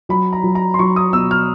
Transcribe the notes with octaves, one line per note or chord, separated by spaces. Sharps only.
F#3 B5
A#5
F#3
A#5
C6
F#3 C#6
D#6
B2 E6
F6